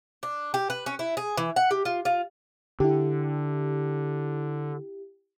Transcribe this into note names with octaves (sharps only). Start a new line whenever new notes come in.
D4
G4
B4
C#4
E4
G#4
E3
F#5
G4
F4
F4
D3 E4 G4